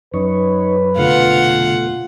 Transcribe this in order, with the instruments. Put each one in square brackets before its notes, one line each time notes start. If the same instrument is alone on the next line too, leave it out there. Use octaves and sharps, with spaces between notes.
[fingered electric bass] F#2 [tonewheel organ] D#4 C#5 [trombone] B4
[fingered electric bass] F1 D3 [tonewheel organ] B2 A3 [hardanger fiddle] F4 F#5